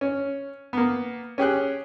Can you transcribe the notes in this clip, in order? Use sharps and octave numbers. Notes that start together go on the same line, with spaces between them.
C#4
A#3 B3
C#4 G4 G#4 F#6